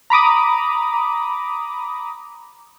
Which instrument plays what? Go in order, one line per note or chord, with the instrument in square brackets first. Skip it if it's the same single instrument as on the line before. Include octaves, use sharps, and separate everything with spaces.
[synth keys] A#5 B5 D6 D#6